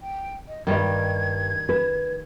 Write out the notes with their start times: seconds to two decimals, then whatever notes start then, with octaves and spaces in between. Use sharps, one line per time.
0.01 G5
0.48 D#5
0.67 G2 D#3 G3 D#5 G#6
1.69 B4